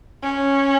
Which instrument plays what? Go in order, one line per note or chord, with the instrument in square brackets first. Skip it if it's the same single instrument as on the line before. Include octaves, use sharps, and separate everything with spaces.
[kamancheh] C#4